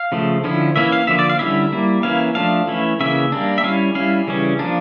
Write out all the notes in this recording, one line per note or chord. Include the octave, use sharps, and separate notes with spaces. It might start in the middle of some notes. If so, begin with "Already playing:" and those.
Already playing: F5
C#3 F3 A3
D3 F3 C#4 E4
E3 A#3 C#4 E4 E5
F5
D3 F3 A#3 E5
D5
F5
D3 G3 C#4 E4 E5
G3 A#3 E4
E3 A#3 C#4 E4 F5
F3 A3 D4 F5
E3 A3 C#4 E4
C#3 E3 A#3 C#4 E5
G3 A#3 D4
E5
G3 C#4 E4 F5
G3 C#4 E4 F5
C#3 E3 G3 C#4
F3 A#3 D4